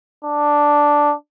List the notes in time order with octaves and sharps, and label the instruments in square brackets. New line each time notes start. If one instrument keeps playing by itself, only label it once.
[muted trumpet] D4